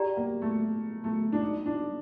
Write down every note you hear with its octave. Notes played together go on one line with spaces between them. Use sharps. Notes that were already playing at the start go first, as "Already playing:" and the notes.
Already playing: G4 D5 G5 A#5
A#3
A3
A3
D4
D#4
D4